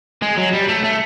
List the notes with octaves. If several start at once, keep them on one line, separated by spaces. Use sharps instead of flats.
G#3
F#3
G3
A3
A3